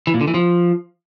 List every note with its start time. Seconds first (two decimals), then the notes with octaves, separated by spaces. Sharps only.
0.07 E3
0.14 A#2
0.21 D3
0.28 E3
0.34 F3